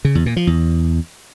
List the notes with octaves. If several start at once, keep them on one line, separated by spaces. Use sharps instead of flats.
C#3
E2
A#2
F3
E2